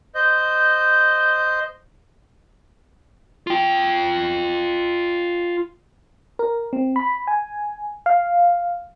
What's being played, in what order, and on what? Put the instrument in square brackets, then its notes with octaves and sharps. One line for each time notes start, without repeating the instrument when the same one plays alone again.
[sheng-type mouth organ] C5 D#5 G6
[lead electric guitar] F4 G5
[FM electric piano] A#4
C4
B5
G#5
F5